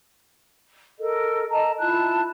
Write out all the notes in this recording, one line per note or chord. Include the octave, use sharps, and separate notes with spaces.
A4 A#4 D#5
D#5 A5 A#5
E4 F4 A5 F#6